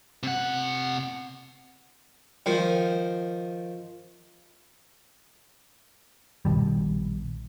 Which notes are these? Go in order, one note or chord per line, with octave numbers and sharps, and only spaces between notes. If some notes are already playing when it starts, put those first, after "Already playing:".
C3 F#5
D#3 F3
A#1 B2 D#3 G3